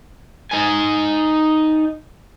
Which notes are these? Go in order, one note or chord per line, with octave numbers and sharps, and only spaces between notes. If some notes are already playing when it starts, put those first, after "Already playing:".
D#4 G#5